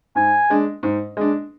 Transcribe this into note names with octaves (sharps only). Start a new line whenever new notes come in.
G#2 G#5
G#3 D4
G#2
G#3 D4